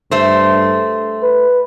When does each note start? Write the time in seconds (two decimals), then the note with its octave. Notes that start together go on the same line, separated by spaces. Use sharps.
0.11 G2 A3 C5
1.23 B4